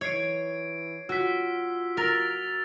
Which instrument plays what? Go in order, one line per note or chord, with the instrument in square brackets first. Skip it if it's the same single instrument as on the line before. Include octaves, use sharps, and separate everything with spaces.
[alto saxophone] E3 [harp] C#5 [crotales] G#6 C7 D7
[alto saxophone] F4 [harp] F#4 [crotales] E6 B6
[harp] A#4 [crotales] E6 A6 F7